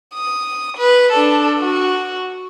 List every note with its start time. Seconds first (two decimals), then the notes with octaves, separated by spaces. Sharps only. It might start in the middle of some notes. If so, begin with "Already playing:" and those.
0.14 D#6
0.77 B4
1.12 D4 A4
1.59 F#4